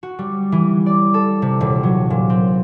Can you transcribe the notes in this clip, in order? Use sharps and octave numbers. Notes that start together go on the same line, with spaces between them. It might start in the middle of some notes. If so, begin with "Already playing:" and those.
F#4
G3
E3
D5
A4
C3
D#1
F#3
A#2
C4